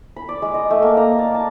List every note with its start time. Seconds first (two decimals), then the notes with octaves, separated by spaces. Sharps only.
0.16 B5
0.29 D5
0.42 G#3
0.54 D#5
0.70 A3
0.82 A#3
0.97 A#5
1.19 D5
1.34 A5